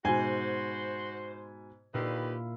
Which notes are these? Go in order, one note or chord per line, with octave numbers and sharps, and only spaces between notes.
G#2 B2 F#4 C5 G#5
A#2 D#3 E4 F4 G4 B4